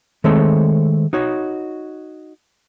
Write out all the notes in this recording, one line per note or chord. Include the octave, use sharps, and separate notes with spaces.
D#3 G#3 A3 C4 A4 C#5
D#4 F#4 C#5